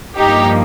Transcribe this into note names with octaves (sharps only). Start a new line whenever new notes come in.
G2 F3 A#3 D#4 G4